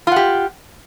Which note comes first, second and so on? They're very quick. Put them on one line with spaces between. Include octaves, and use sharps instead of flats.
F4 F#5 G4